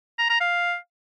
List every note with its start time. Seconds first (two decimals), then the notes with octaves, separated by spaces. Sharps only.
0.18 A#5
0.29 A#5
0.41 F5